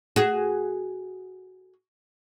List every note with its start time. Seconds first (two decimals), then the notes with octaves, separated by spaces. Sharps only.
0.16 F#4 G#4